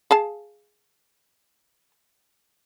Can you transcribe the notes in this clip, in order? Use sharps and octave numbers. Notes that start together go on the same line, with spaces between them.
G#4 F5 A5